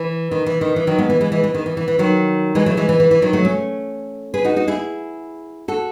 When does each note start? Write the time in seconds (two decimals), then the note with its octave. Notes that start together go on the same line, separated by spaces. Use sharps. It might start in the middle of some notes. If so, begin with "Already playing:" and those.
Already playing: E3
0.31 D#3
0.46 E3
0.61 D#3
0.76 E3
0.87 D#3 F#3
0.98 G#3 B3
1.10 E3
1.21 E3 G#3
1.32 E3 G#3
1.44 E3
1.54 D#3
1.66 E3
1.77 E3
1.88 E3
1.99 D#3 F#3
2.55 E3 G#3
2.66 F#3 A3
2.77 E3 G#3
2.89 E3
3.00 E3
3.11 E3
3.22 D#3 F#3
3.33 F#3 A3
3.45 A3 C#4
4.34 G#4 B4
4.44 D#4 F#4
4.56 D#4 F#4
4.68 E4 G#4
5.68 F#4 A4